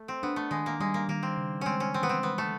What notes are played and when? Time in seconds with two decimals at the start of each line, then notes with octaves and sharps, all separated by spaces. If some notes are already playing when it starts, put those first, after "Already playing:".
Already playing: A3
0.08 C4
0.23 B3 D4
0.36 A3
0.51 D#3 G#3
0.66 A#3
0.80 G3 G#3
0.94 A#3
1.09 D#3 A#3
1.23 C4
1.37 C#3
1.61 G#3 C4 C#4
1.80 C#4
1.94 E3 C4
2.03 B3
2.09 C4
2.23 G#3 B3
2.38 A3